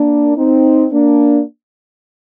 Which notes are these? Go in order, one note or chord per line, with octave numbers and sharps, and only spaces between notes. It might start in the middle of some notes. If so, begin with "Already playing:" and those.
Already playing: A#3 D4
C4 D#4
A#3 D4